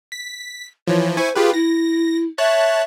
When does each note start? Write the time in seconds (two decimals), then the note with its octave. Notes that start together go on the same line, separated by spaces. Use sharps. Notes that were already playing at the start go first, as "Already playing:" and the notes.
0.12 B6
0.87 E3 F3 C#5
1.17 E4 C5 G#5 C#6
1.36 F4 G4 G#4 B4
1.54 E4 A#6
2.38 C#5 E5 A5 F#6